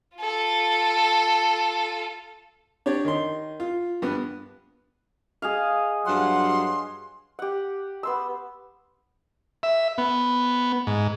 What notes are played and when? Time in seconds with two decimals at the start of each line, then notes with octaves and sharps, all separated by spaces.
0.18 F4 A4
2.86 D4 G4 C#5 D5
3.05 D#3 C6
3.60 F4
4.02 G2 B3
5.42 G#4 D#5 F5
6.05 G2 F#3 F#5 C6
7.39 G4 F#5
8.03 B3 C6 E6
9.63 E5
9.98 B3
10.87 G#2